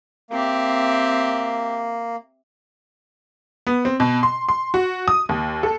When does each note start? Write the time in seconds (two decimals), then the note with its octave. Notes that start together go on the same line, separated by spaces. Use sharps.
0.30 A#3 C4 G4 E5
3.67 B3
3.85 C4
4.00 B2
4.23 C6
4.49 C6
4.74 F#4
5.08 D#6
5.29 D#2
5.63 A4